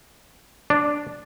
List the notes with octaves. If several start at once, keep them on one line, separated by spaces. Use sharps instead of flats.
D4